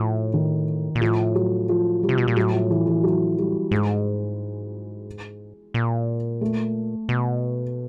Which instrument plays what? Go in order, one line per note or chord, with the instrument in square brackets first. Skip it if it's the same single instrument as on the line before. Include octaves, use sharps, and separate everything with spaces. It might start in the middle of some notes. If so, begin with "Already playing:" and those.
Already playing: [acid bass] A2 [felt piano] F3
[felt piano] D#3
[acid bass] A#2
[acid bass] A2 [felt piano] F3
[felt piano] F#3
F3
G3
[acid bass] C3
B2
A#2
[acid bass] A2 [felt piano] F#3
[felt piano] F3
E3
E3
F#3
G3
[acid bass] G#2 [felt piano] G#3
[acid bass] A#2
[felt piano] A3
[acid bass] B2